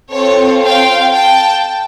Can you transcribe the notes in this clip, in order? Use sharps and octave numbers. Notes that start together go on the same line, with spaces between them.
C4 F4 A4 C#5
F5 G5
G5 A5